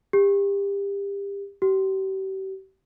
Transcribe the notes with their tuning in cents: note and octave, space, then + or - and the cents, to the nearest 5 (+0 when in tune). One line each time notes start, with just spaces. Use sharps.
G4 +30
G4 -40